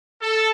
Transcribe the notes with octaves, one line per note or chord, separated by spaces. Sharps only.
A4